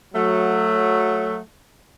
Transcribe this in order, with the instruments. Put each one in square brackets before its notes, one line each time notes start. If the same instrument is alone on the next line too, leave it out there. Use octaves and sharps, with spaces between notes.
[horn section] F#3 A3